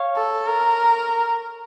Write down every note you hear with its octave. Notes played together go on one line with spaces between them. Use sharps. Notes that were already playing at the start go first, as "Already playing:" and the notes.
Already playing: C#5 F5
A4
A#4